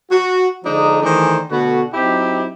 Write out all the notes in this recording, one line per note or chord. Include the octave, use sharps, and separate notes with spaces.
F#4
D3 F3 G#3 D4 D#4
D#3 E3 A3 D4 G#4 C5
B2 D3 A3 B3 F#4
F#3 C4 D#4 E4 G4